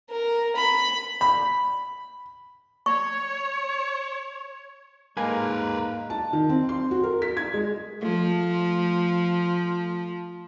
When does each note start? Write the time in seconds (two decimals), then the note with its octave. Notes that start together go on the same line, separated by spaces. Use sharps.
0.10 A#4
0.56 B5
1.21 B5
2.86 C#5 C#6
5.17 G#2 G#3 A#3 A#4 B4 G#5
6.10 A5
6.33 D#3
6.49 C4
6.69 C6
6.91 F#4
7.03 A#4
7.22 B6
7.37 G#6
7.54 G#3
8.02 F3 A3